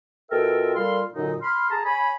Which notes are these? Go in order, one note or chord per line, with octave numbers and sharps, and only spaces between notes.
B2 F4 A4 A#4 E5 G5
A#2 G3 A4 F5 C6
F#2 A#2 D3 F#3 D#4
B5 C6 F6
G#4 A5 A#5
C#5 G#5 B5